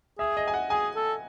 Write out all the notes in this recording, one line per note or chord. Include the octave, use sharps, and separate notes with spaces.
G#4 E5
D#5
G#5
F#5
G#4 G#5
A4